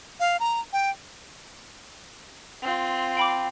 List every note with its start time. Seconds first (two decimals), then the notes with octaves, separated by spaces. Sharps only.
0.20 F5
0.40 A#5
0.73 G5
2.62 C4 F4
3.17 G5 B5 D6